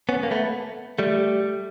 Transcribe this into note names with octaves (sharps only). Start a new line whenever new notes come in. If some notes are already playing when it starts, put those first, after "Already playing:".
B3 C#4
A#3
A3 B3
G3 A3